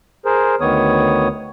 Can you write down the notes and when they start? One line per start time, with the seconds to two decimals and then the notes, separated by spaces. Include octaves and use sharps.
0.25 G#4 A#4 C5
0.61 D2 D#3 B3 C#5 D#6